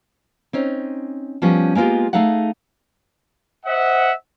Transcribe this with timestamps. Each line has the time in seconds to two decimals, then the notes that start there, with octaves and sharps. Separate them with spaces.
0.53 C4 C#4 D#4
1.42 F3 G3 B3 C#4
1.75 G#3 A#3 B3 F4 G4
2.13 A3 D#4 G#4 F5 F#5
3.66 C5 D#5 E5 F#5